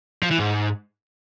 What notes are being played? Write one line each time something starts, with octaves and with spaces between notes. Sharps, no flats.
F3
E3
G#2